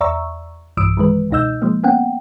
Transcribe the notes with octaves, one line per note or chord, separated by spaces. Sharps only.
E2 D5 E5 A#5 C#6 E6
B1 G2 E3 D#6 E6 D7
D#3 E3 G#3 B4
C#2 B2 D#4 D#5 E6 G6
F3 G#3 A#3
A#3 B3 C#4 F#5 G5